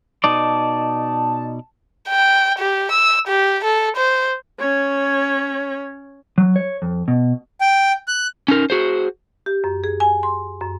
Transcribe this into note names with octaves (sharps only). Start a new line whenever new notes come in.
B2 D#4 D5 A5
G5
G4
E6
G4
A4
C5
C#4 C#5
F#3
C#5
F2
B2
G5
F#6
C#4 D#4 A#4
F#4 G#4 C5
G4
F#2
G#4
G#5
C6
F#2